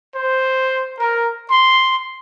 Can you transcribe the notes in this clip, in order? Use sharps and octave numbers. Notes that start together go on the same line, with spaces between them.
C5
A#4
C6